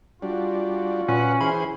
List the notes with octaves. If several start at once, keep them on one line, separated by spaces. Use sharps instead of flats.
G3 D4 F4 F#4
A#2 C#4 B4 F#5
E3 G#4 C5 B5